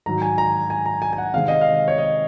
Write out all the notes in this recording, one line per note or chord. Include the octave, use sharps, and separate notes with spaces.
G#2 D#3 F#3 A#5
G#5
A#5
G#5
A#5
G#5
G#5
F#5
C3 D#3 G#3 C4 F5
D#5
F5
C#5
D#5